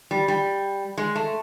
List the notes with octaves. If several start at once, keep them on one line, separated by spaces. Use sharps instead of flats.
G3
G3
G#3
A3